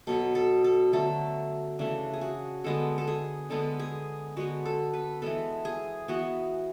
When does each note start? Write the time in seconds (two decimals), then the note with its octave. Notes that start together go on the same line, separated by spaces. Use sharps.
0.07 B2 F#3 B3 A4
0.35 A4
0.64 A4
0.93 D3 F#3 A3 A4
1.79 C#3 E3 A3 D4
2.13 G#4
2.21 F#4
2.64 D3 G#3 B3 A4
2.98 A4
3.08 G#4
3.50 D3 G#3 B3 A4
3.79 G#4
4.36 D3 G#3 B3 F#4
4.65 A4
4.93 B4
5.22 E3 G#3 B3 A4
5.65 G#4
6.08 E3 B3 F#4